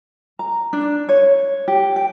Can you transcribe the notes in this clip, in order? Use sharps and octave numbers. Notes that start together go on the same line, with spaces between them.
A#5
D4
C#5
G4
G5